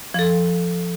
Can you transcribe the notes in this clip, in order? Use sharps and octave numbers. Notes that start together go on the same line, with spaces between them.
F3 A4